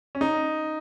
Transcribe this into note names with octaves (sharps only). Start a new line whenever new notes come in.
C#4
D#4